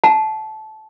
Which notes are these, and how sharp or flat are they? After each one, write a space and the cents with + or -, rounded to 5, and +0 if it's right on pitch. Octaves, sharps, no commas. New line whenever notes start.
F#5 +0 A5 -20